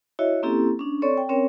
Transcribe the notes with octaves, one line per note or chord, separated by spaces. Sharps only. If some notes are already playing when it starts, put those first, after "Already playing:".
E4 F#4 C#5 D#5 E5
A#3 C4 C#4 E4 G4 A4
C#4 D4
C4 A4 C#5 D5 C#6
G5
C4 C#4 A#4 C#5